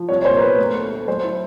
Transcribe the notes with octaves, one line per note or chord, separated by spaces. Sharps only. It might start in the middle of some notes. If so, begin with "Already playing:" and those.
Already playing: F3
C2 C#5
C#5
A#2 C5
A#4
B3 B4
D2
A3
A3
F#3 C5
E4